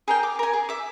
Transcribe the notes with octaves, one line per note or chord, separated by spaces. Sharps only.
G#4 A#4 G5
D6
A#4 G#5
G#4
E5 D6